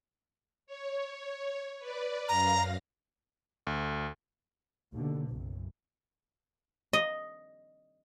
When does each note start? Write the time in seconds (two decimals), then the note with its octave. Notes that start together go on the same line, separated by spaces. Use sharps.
0.67 C#5
1.79 B4 D5
2.28 F#2 F5 A#5 A#6
3.67 D2
4.93 D#2 B2 D3
5.28 F#1 B1 F#2
6.93 D#5